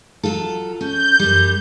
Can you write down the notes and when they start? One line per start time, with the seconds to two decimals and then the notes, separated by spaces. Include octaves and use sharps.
0.23 F#3 F4 A4
0.81 C#4 G6
1.19 F#2 G3